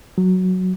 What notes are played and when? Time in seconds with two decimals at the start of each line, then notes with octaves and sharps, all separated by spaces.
0.18 F#3